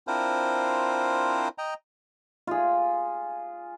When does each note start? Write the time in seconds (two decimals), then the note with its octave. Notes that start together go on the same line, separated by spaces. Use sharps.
0.07 C4 D4 E4 F4 A#4 C5
1.58 D#5 G5 A#5
2.47 F4 G#4